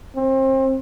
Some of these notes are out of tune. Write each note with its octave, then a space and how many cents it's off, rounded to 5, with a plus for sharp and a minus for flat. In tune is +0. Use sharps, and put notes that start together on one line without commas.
C4 +30